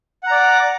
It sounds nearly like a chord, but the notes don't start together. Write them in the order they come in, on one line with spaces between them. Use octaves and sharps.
F#5 A#5 D5 D6